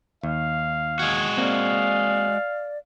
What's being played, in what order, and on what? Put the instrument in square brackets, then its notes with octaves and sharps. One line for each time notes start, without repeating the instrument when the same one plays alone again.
[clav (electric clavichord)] D#2 [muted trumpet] F5
[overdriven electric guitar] G#3 F#4 [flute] G#6
[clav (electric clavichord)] A#3 C4 [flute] D5 [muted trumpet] F5